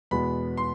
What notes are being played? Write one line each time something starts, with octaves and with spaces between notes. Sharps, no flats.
E2 B2 G#3 B3 B5
C6